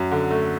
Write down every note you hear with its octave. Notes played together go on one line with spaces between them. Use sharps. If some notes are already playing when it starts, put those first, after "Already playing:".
Already playing: F#2 F#3
D3
A3